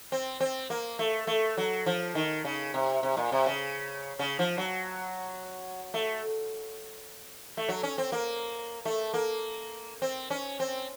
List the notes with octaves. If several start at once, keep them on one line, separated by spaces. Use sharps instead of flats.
C4
C4
A#3
A3
A3
F#3
F3
D#3
C#3
C3
C3
A#2
C3
C#3
C#3
F3
F#3
A3
A3
F#3
C#4
C4
A#3
A3
A#3
C4
C#4
C4